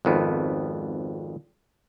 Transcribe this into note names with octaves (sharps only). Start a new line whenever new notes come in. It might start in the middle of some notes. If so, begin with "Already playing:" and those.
G#1 F2 B3